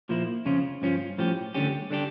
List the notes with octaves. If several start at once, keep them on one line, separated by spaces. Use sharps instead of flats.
A#2 F3 A#3 E4
F2 C#3 F3 C#4 F4
G2 F3 C#4 F4
A2 F3 C#4 G4
D2 D3 G3 C#4 G4
D3 G3 D4 G4